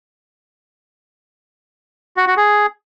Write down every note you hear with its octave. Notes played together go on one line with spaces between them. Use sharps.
F#4
F#4
G#4